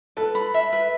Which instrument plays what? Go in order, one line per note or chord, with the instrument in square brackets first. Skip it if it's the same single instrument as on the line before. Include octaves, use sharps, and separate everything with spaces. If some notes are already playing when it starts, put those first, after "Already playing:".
[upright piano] A4 [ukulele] B4
[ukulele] B5
E5
B4